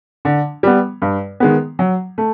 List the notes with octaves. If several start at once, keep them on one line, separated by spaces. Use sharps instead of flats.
D3
G3 B3
G2
D#3 G#3 B3
F#3
A3